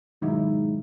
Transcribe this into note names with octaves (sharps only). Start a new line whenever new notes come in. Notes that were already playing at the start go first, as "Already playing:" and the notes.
G#2 B2 D#3 F#3 D#4 E4